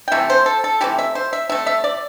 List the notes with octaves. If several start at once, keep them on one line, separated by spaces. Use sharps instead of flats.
G5
C3 E3 A3 E5
C5
A4
A4
C3 E3 A3 G4
E5
C5
E5
C3 A3 E5
E5
D5